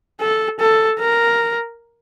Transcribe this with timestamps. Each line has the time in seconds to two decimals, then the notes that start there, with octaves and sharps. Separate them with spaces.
0.21 A4
0.60 A4
0.99 A#4